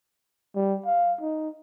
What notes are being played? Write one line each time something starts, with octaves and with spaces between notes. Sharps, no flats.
G3
F5
D#4